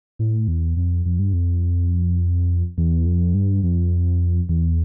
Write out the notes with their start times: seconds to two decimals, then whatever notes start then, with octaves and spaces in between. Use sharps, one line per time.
0.19 A2
0.48 E2
0.77 F2
1.06 F2
1.19 G2
1.33 F2
2.78 E2
3.06 F2
3.34 G2
3.63 F2
4.49 E2